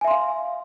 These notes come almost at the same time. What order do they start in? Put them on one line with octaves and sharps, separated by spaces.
G#5 E5 C6 F5